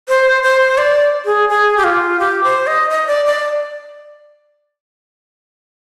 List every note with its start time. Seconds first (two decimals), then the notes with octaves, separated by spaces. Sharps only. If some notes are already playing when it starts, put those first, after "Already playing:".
0.08 C5
0.43 C5
0.78 D5
1.25 G#4
1.49 G#4
1.77 G4
1.84 F4
2.20 G4
2.44 C5
2.67 D#5
2.90 D#5
3.07 D5
3.26 D5